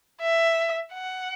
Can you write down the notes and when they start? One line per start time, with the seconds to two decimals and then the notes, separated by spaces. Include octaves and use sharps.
0.21 E5
0.93 F#5